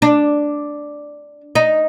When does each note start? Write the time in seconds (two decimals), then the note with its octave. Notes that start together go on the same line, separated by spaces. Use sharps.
0.02 D4
1.55 D#4